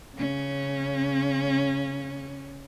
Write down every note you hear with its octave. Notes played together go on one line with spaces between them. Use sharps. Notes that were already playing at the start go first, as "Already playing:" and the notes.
C#3 C#4